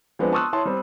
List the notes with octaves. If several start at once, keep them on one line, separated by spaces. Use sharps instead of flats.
F3 G#3 B3 C4 D4
A5 C6 C#6 D#6 E6 F#6
E4 C#5 A5 C6
G3 C4